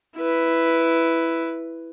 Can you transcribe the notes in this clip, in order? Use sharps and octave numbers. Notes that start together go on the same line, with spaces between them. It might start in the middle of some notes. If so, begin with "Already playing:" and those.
E4 B4